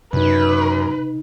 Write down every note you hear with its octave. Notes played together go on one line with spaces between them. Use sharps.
F#2 C3 D#4 B4